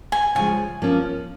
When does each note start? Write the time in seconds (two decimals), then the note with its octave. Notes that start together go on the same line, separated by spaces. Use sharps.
0.12 G#5
0.35 C#3 F3 G#3 G#5
0.82 F3 A#3 C#4